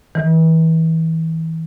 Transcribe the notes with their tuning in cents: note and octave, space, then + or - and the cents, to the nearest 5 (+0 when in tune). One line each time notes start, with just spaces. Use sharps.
E3 -30